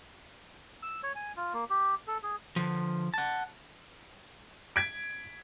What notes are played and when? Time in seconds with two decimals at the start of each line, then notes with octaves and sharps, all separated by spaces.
0.83 E6
1.03 C#5
1.15 G#5
1.37 F4
1.54 A#3
1.70 G4
2.07 A4
2.23 G#4
2.56 D3 F3
3.14 F#5 A5
4.76 G#6 B6 D7